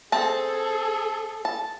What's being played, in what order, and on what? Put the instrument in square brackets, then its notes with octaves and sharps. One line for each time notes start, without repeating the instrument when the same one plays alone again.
[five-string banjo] C4 A5 [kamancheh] G#4 A4
[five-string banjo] A5